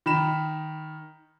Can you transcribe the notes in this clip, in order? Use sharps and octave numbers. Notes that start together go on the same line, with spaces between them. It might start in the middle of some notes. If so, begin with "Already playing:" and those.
D#3 B5 E7